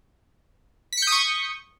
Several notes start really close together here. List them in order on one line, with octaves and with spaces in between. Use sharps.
B6 C#7 G6 D#6 C#6